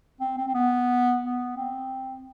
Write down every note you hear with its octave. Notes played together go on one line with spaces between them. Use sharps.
C4
C4
C4
B3
B3
C4